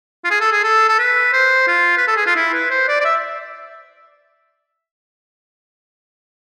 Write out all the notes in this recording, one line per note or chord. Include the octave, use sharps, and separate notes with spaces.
F4
G#4
A4
G#4
A4
A4
B4
C5
F4
B4
A4
G#4
F4
E4
B4
C5
D5
D5
E5